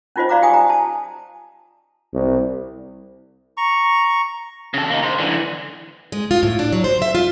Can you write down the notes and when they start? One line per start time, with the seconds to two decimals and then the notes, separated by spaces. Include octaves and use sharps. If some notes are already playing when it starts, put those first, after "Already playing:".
0.16 C#4 D#4 F4 F#4 C5 D#5
0.29 F#4 D5 F5 A#5 D6
0.42 G4 G5 G#5 D#6
0.54 A#5
0.70 A5
2.13 C2
3.57 A#5 C#6
4.74 C#3 A4
4.90 A#3 D#4
5.03 A#4 C5
5.19 D3 E3
6.12 G#3
6.31 F4
6.43 A2
6.59 D4
6.72 F#3
6.84 C5
7.02 E5
7.15 F4